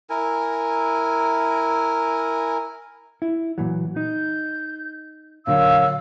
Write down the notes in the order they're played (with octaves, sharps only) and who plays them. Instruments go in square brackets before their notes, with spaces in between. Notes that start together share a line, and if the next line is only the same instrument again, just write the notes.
[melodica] E4 A#4 G#5
[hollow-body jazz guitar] E4
A#2 E3 F#3
[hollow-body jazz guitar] D#4 [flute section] G6
[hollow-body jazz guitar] A#2 D3 F#3 [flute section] A#4 C#5 E6 [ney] F5